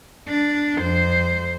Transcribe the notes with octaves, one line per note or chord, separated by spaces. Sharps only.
D4
F2 C5